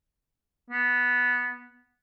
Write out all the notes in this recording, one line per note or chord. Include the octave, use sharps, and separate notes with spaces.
B3